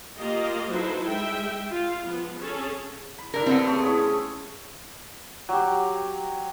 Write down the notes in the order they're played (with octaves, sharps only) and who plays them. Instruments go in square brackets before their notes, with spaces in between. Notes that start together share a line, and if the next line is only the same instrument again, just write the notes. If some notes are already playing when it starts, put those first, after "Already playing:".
[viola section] A#3 F4 G4 D#5
F#3 D#4 E4 A4 B4 C5
G#3 E5 G5
F4
F3 B3
C#4 G#4 A4
[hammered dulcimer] B5
[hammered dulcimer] G2 E4 [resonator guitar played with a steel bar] D4 A#4
[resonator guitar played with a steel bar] B3 C4 [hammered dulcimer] E4 A4 C5
[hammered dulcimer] C#3 A3 C#4
E4 G#4 C#5
[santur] F#3 G4